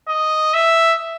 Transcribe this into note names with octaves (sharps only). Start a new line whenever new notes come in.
D#5
E5